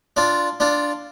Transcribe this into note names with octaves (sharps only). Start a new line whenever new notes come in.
D4 F4
D4 F4